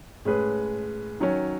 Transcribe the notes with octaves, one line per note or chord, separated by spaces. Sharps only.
A2 G#3 C#4 G#4 B4
D#3 F#3 C#4